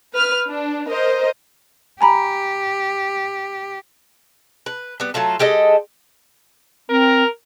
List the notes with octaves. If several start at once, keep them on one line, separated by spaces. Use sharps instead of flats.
B4 F6
D4
A#4 C5 D#5
G4 G#5 A#5 B5
B4
G3 B3
F#3 A3 F4 A4
G#3 G4 A4 D#5
C4 A#4